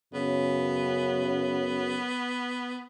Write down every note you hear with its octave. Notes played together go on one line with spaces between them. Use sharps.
F#2 C#3 B3